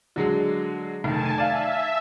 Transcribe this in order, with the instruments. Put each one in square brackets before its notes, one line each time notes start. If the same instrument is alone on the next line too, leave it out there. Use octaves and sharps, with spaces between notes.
[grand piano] D3 F#3 G#3
[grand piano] F1 D#3 [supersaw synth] G#5 A5
[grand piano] D5 F5 [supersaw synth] E5